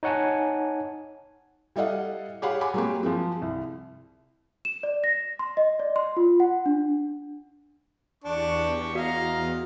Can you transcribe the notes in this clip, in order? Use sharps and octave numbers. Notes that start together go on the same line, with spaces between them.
D#4 C#5 F#5 G#5 A5
G3 E4 A4 D#5 F5 F#5
G4 G#4 C#5 F5 F#5 B5
G#5 B5 D6
F#3 G#3 A#3 C4 F#4 G4
F3 G#3 C4
C2
E7
D5
A#6
C6
D#5
D5
C6
F4
F#5
D4
E2 D4 G4 C#6
F#4 D#5 F5 A#5